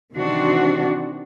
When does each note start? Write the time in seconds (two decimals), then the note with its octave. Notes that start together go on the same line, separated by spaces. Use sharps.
0.14 C3 D#3 E3 C4 D4 F#4